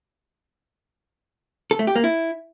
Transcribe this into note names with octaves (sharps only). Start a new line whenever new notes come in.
A4
A3
G4
A#3
E4